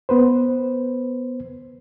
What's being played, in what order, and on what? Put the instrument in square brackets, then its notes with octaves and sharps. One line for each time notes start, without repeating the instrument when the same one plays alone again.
[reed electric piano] B3 B4 C5